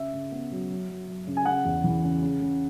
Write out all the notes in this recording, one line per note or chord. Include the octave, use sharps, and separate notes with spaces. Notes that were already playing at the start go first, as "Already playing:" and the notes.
Already playing: C#3 E5
C#3
B3
F#3
F#3
F#3
F#3
C#3
G#5
C#3 F#5
E2
E3
C#3
C#3
C#3